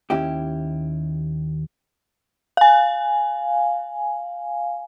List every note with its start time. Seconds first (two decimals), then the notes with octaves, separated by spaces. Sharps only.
0.10 D#2 C#4 E4 G4
2.57 F5 G#5